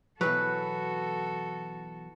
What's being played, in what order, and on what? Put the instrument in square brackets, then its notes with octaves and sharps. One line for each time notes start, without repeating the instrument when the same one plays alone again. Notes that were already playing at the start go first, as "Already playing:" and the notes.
[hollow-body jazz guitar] B2 E3 F#3 [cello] F#4 A4 [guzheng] B4